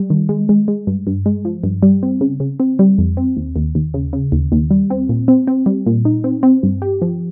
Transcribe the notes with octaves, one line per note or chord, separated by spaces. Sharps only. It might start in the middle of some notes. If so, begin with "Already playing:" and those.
Already playing: G3
D#3
G#3
G#3
G#3
G2
G2
G#3
F3
G2
G3
C4
C#3
C#3
C4
G3
F2
C4
D#2
D#2
D#2
C#3
C#3
D#2
D#2
G3
C4
A#2
C4
C4
G3
A#2
D#4
C4
C4
G2
G4
F3